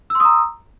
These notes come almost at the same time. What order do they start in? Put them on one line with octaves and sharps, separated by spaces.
E6 C6 D#6 A#5